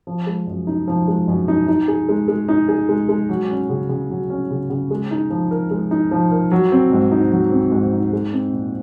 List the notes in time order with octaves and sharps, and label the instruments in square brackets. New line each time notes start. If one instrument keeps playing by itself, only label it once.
[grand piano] F3
G#3
F#2
D#4
F3
G#3
F#2
D#4
D#4
G#4
G#3
G#3
D#4
G#4
G#3
G#3
F#3
C#4
C#3
C#3
F#3
C#4
C#3
C#3
G#3
D#4
F3
A#4
G#3
D#4
F3
A#4
F#3
C4
G#2
D#4
F#3
C4
G#2
D#4
G#3
C4
A#2